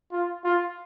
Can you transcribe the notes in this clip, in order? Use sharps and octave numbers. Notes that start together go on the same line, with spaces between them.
F4
F4